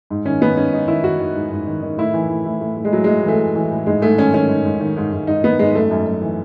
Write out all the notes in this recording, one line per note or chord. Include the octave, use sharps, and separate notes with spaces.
G#2
D#3 C#4
D#3 B3
G#2 C#4
G#2 D#4
D#3 E4
D#3 F#4
D#3
G#2
G#2
D#3
D#3
A2 E4
E3
A2
A2
A2
A2
G#3
A2 F#3
A2 G#3
E3 A3
A2
E3
A2
G#2 G#3
G#2 A3
D#3 C#4
D#3 C#4
G#2
G#2
D#3
G#2
G#2
G#2 D#4
D#3 B3
G#2 G#3
F#2 A3
F#2
F#2
E3